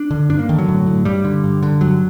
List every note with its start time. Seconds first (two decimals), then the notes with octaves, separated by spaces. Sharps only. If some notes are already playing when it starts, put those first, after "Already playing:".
Already playing: D4
0.11 D3
0.29 G2 D4
0.39 A#3
0.49 D3 D#3
0.59 F#3
0.68 A2
0.86 A2
1.05 G2 G3
1.24 D3
1.44 G2
1.63 D3
1.81 G2 F#3